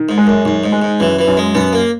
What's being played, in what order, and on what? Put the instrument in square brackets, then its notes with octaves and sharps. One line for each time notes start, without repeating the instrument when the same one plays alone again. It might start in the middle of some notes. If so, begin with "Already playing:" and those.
Already playing: [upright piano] D#3
[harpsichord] G#2
[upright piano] G#3
[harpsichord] F#2
[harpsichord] F#2 [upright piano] D#3
[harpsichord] G#2
[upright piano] G#3
[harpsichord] G#2
[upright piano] F#2 [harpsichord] E3
[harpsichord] E3
[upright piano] F#2
[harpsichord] G#3
[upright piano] F#2 [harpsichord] B3
[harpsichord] A#3